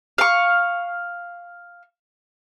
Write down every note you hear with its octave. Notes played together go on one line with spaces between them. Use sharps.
F5 C#6